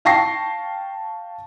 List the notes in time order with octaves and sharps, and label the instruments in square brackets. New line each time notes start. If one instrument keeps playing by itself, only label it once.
[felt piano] F5 G5 A5 C#6 A#6 C7